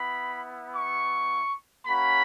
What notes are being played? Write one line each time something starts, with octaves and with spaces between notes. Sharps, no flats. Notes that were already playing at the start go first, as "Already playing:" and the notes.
Already playing: B3 E4 B5
C#6
A#3 C#4 F#4 B5